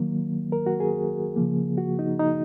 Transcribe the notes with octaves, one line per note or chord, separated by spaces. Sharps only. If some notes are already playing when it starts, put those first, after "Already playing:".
Already playing: D#3 F#3 A#3
A#4
F#4
G#4
C#3 F3 A#3
F#4
D#4
D#4